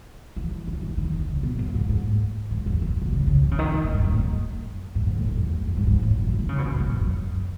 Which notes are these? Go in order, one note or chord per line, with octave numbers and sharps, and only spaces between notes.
E3
D#3
E3
D#3
D#3
C#3
B2
F#2
G#2
G#2
G#2
E2
F#2
B2
C#3
C#3
D#3
C#3
D#3
D#3
A2
G#2
F#2
A2
F#2
G#2
G#2
A2
D#3
F#2
E2
F#2
G#2
G#2
A2
B2
D#3
D#3
C#3
B2
C#3
B2
A2
F#2